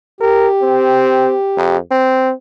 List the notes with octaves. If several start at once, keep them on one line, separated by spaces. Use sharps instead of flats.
G4 A#4
C4
F2
C4